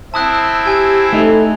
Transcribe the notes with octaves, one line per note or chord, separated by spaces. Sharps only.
C4 E4 A5 D#6 F#6
G4 G#5 G#6
A3 D#4 A4